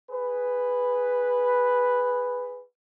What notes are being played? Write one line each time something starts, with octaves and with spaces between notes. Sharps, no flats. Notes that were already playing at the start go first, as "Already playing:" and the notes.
G#4 B4